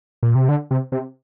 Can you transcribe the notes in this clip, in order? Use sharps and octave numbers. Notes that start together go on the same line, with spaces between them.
A#2
C3
D3
C3
C3